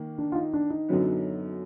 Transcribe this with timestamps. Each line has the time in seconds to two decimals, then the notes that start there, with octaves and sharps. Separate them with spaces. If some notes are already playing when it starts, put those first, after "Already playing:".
Already playing: D#3 A#3
0.18 D4
0.32 F4
0.36 D#4
0.53 D4
0.70 D#4
0.89 F#2 D3 F#3 B3